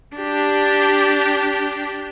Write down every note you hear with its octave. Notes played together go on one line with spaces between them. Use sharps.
D4 G4